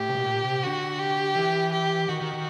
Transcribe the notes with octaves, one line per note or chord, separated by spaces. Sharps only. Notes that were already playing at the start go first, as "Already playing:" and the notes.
Already playing: A2 G4
C3
B2
A#2
C3
D3 F#4
G4
E3
G4
D#3 F#4
D#3
D#3